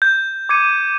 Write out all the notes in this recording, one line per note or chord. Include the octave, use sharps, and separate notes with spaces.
G6
D6 G#6 C#7 D#7